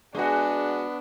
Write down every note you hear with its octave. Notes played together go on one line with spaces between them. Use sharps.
G#3 B3 D4 F#4 G#4 G#5